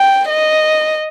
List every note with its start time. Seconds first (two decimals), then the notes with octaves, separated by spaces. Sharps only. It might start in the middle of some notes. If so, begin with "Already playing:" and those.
Already playing: G5
0.30 D#5